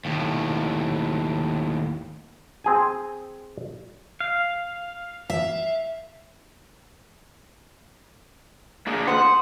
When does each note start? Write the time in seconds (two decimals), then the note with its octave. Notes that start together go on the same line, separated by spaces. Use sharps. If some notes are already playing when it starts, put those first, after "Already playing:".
0.05 D#2 A2
2.64 C4 G#4 G#5
4.20 F5
5.30 E5
8.87 A#3 D4 G#4
9.07 C5 F#5 D#6